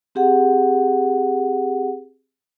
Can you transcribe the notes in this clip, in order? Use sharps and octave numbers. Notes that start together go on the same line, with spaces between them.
C4 G4 G#4 F#5